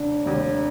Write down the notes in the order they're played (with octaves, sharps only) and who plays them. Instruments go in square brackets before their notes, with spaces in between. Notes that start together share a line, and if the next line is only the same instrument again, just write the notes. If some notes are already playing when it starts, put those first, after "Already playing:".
Already playing: [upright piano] F1 D#2 D3 [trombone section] D4
[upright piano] F1 D#2 D3 G3